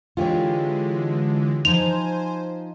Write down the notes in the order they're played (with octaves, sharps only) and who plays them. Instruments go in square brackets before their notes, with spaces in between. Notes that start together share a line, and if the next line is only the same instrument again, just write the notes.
[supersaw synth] D3 E3 G#3 [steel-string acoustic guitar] F4 G4 C#5
[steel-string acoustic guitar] F3 D#4 [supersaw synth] C5 G#5 [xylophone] F7